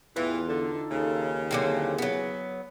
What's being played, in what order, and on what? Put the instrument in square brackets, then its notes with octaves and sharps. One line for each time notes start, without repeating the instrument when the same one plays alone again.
[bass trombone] E2 [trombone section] A2 E4 G4 [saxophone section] E3 [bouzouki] F4
[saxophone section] D3 [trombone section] D#4 A4
[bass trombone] D#2 [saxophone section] C#3
[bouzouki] D3 F#3 C4 [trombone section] A#3 E4 G#4
[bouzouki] F#3 B3